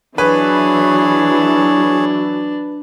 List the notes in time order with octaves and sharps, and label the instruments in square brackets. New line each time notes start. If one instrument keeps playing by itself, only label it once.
[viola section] E3 F#3 [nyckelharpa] D4 [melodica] G#4 C#5 [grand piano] B4